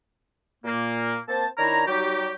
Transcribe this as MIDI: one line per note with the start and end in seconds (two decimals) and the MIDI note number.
0.64 1.18 46
0.64 1.18 58
1.29 1.47 58
1.29 1.47 60
1.29 1.47 72
1.29 1.47 81
1.58 1.83 51
1.58 1.83 62
1.58 1.83 64
1.58 1.83 73
1.58 1.83 82
1.87 2.35 54
1.87 2.35 55
1.87 2.35 63
1.87 2.35 66
1.87 2.35 67